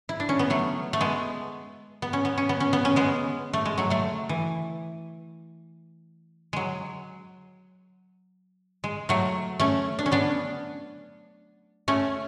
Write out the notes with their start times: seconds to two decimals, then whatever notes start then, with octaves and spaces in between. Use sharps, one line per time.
0.09 E4
0.20 D4
0.29 C#4
0.39 B3
0.50 F#3 A3
0.93 A3
1.01 G#3 B3
2.02 B3
2.13 C#4
2.25 B3
2.38 C#4
2.49 B3
2.60 C#4
2.73 B3
2.85 C#4
2.96 G#3 B3
3.53 A3
3.66 G#3
3.78 F#3 A3
3.90 F#3 A3
4.29 E3
6.53 F#3 G#3
8.84 G#3
9.09 F#3 A3
9.60 A3 C#4
9.99 D4
10.06 C#4
10.12 B3 D4
11.88 A3 C#4